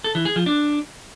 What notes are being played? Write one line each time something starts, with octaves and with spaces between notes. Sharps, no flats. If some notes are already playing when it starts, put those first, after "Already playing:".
A4
E3
G#4
F3
D4